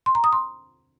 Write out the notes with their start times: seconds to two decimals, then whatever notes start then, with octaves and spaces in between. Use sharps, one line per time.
0.06 C6
0.15 A#5
0.24 D#6
0.33 C6